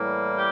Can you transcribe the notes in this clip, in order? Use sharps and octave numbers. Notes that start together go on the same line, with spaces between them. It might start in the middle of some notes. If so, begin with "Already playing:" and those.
Already playing: A2 E3 G3 A#3
G4